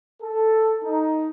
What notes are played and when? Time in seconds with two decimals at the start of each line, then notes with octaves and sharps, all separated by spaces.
0.22 A4
0.83 D#4